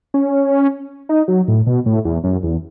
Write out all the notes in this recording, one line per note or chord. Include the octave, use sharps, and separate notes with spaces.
C#4
D#4
F#3
A2
B2
A2
E2
F#2
E2